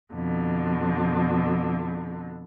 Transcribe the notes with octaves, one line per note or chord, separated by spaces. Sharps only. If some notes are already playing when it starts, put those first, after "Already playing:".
F2 B2 D3